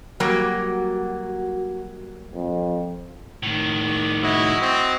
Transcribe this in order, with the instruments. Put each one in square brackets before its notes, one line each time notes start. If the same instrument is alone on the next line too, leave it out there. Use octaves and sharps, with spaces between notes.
[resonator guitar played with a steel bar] F#3 G3 A#3 [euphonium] F#4
[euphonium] F2
[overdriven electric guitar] A2 D#3
[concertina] D5 C#6
[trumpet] E4 [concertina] F#4 C#5 D#5
[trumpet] C4